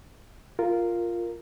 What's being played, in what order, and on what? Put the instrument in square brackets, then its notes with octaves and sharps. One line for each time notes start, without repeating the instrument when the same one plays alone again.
[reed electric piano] F4 A#4